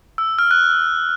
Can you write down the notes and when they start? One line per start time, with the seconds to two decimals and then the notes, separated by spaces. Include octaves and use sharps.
0.18 E6
0.39 F6
0.51 F#6